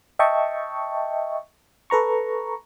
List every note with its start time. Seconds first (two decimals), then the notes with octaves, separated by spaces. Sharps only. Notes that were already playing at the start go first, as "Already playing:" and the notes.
0.19 D#5 E5 G5 A5 C#6
1.90 A4 B4 A#5 C#6